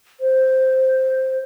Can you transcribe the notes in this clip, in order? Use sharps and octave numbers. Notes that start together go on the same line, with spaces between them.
C5